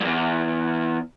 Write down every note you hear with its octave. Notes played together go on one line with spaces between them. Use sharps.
E2 G2